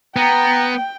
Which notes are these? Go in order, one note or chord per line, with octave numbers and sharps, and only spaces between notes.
B3 G5 A#5